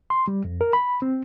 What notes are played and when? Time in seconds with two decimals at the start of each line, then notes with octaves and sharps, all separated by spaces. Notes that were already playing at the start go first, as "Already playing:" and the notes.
0.10 C6
0.28 G3
0.45 F2
0.61 A#4
0.73 B5
1.02 C4